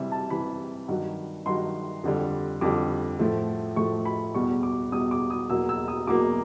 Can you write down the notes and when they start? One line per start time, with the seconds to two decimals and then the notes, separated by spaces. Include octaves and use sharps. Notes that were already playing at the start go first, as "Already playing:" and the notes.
Already playing: C3 E3 G3 E5
0.12 A5
0.30 C3 E3 G3 B5
0.88 G2 D#3 F#3
1.46 G2 D#3 F#3 C6
2.04 F2 D3 G3
2.61 F2 D3 G3 D6
3.19 A2 F3 A3
3.76 A2 F3 A3 C#6
4.05 B5
4.34 E2 B2 G3 C#6
4.63 D6
4.92 E2 B2 G3 D#6
5.11 D6
5.30 D#6
5.50 E2 B2 F#3 A#3 E6
5.69 E6
5.88 D#6
6.07 E2 B2 F#3 A#3 D6